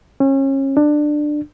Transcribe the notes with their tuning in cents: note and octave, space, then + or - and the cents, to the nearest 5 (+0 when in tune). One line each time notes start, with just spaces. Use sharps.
C#4 -30
D4 +20